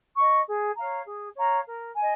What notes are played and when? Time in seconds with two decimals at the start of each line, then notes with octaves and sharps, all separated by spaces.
0.16 D#5 C#6
0.46 G#4
0.76 C#5 F5 A#5
1.05 G#4
1.35 C#5 F5 A#5
1.66 A#4
1.96 D#5 G#5